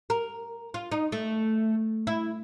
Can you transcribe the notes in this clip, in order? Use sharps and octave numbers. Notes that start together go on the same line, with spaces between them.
A#4
F4
D#4
A3
E4